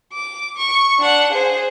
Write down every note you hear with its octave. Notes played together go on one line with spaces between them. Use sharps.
D6
C#6
D4 F#5
G#4 C5